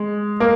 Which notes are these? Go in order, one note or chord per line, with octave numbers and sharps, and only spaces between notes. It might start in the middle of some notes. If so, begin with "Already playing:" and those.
Already playing: G#3
A#3